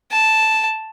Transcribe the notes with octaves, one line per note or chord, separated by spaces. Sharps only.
A5